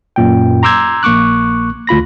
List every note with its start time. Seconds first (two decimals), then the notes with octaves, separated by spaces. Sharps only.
0.16 F#2 A#2 G5
0.63 A#5 C6 D6 E6 G6 G#6
1.03 A#1 A#3 C#6 D6 F#6
1.87 D2 F4 B5 A#6